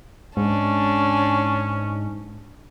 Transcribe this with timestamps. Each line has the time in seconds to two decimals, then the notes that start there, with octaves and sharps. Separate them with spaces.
0.37 G#2 C#4 D4